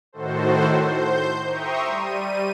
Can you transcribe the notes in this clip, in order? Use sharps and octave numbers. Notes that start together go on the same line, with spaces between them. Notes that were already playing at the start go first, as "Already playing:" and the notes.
A2 D#3 F#4 A4 C5
C5 G6
E5 G5 A#5 C6 C#6 D#6
G3 D#7